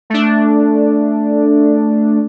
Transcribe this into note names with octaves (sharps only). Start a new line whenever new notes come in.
A3 D4